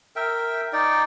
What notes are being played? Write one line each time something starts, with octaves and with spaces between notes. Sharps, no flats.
A#4 E5 G5
D#4 D5 G5